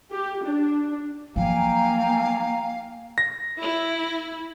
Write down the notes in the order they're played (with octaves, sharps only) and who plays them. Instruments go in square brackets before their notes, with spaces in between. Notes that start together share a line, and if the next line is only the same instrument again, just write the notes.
[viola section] G4
D4
[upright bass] F3 F#3 [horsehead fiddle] A#3 [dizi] F5 [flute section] G5 G#5 A#5
[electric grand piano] A#6
[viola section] E4